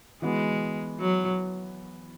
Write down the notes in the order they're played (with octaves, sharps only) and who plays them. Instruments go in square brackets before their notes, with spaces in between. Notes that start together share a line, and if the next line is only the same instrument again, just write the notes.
[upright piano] E3 B3 F#4 [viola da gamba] G#3
[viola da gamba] F#3